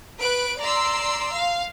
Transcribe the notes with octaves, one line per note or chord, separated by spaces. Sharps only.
B4 F#6 D7
D5 A#5 C6 E6
F5